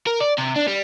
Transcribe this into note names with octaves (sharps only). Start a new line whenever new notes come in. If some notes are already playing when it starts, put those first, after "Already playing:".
A#4
D5
C3
D4
G3